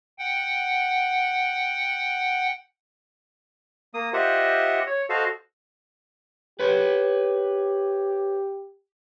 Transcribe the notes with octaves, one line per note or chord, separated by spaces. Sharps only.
F#5 G5
A#3 D#6
F4 G4 C5 D#5 E5 F#5
C#5
F#4 A4 C5 D#5 F5
G4 B4 C#5